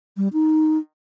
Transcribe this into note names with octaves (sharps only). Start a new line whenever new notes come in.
G3
D#4